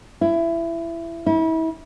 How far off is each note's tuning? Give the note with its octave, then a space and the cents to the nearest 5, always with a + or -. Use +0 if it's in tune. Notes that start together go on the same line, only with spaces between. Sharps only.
E4 +20
E4 -35